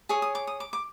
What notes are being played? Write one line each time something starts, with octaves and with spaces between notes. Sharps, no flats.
G#4 C#5 D#6
D#6
D6
D#6
D6
D6